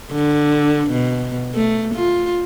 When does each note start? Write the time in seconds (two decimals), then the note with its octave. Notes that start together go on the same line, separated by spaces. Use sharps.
0.12 D3
0.91 B2
1.55 A3
1.95 F4